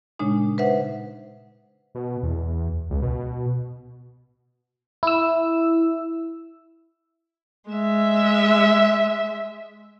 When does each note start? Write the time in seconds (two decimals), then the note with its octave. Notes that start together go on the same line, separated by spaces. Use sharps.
0.19 A#2 C#3 G#3 D4 D#4
0.58 B4 C5 E5 F#5
1.95 B2
2.23 E2
2.90 C#2
3.02 B2
5.03 E4 E6
7.70 G#3 E5